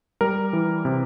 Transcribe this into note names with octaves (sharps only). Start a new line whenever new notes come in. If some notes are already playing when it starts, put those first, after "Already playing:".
G3 A#4
E3
C3